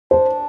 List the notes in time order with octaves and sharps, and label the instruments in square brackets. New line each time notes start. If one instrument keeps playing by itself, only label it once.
[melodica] D4 [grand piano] C5